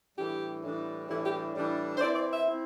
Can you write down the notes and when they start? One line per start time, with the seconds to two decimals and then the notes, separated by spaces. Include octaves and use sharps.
0.17 A2 E3 G3 D4 G4
0.63 A2 E3 G3 D4
1.09 A2 E3 G3 D4 E4
1.24 G4
1.55 A2 E3 G3 D4
1.97 C5
2.01 E3 C4 E4 D5
2.15 D5
2.31 E5
2.46 C4 E4